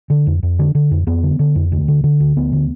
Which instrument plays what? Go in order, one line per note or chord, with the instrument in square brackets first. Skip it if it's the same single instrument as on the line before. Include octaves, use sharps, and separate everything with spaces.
[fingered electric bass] D3
F2
F2
D3
D3
F2
F2 B3
D3
D3
F2
D2
D3
D3
D2
D2 B3
D3